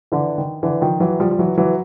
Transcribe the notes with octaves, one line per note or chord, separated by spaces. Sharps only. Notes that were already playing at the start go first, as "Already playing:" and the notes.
D3 E3
D#3
D3 E3
D#3 F3
E3 F#3
F3 G3
F3
E3 F#3
E3 F#3